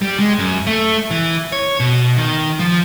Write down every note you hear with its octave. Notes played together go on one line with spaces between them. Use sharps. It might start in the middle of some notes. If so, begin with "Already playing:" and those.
G3
G#3
F#2
A3
E3
C#5
B2
D#3
F3